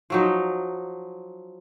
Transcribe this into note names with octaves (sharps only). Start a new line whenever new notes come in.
F3 F#3 D#4